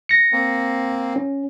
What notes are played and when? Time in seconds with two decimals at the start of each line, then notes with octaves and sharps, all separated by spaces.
0.09 A#6 C#7
0.32 A#3 C4
1.16 C#4